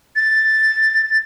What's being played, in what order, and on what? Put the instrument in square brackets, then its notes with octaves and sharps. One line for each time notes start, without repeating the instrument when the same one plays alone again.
[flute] A6